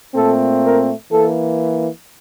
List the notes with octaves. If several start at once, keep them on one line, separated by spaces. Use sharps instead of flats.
A#2 A3 C4 A4
A#4
E3 A#3 A4